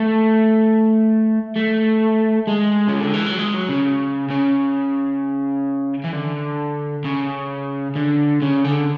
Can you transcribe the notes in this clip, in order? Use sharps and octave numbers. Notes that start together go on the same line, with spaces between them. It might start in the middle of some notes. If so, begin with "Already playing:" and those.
Already playing: A3
A3
G#3
C#3
D3
E3
F#3
G#3
F#3
C#3
C#3
E3
D3
C#3
D3
C#3
D3